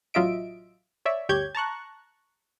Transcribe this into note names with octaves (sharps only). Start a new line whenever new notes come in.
A1 F#3 F4 D#5 E5 D7
C#5 D5 E5
G1 D2 G4 C#5 G6 G#6
A5 A#5 C#6 F#6